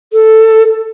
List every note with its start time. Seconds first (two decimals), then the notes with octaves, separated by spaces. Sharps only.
0.13 A4